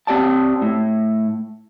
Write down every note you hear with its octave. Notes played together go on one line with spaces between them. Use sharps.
C4 G4 D5 A5
A2